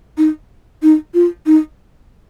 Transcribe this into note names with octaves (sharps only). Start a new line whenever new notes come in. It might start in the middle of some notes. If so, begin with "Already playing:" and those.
D#4
D#4
F4
D#4